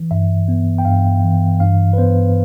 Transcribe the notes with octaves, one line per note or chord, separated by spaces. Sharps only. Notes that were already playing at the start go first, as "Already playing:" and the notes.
Already playing: E3
G2 E5
B3
G5
G2 F5
E3
G2 F5
B4
B3 C5